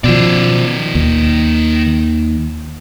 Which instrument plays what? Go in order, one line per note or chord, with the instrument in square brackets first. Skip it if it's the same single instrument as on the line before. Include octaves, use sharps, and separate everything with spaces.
[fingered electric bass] B2 F3 [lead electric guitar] D#3 D5
[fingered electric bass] D#2